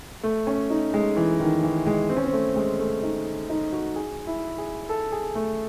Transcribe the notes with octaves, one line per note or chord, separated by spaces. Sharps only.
A3
C#4
D#4
G#3
E3
D#3
E3
G#3
C4
C#4
C4
A3
G#3
A3
D#4
D#4
F#4
G#4
E4
G#4
A4
G#4
A3